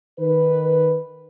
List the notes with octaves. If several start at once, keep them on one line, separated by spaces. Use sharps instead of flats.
D#3 B4